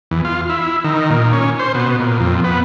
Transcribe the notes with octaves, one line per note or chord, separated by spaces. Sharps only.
E2
F4
E4
D#3
A#2
C#4
C5
B2
A#2
F2
B3